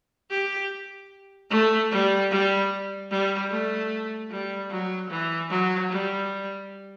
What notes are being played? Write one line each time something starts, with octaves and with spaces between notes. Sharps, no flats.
G4
A3
G3
G3
G3
A3
G3
F#3
E3
F#3
G3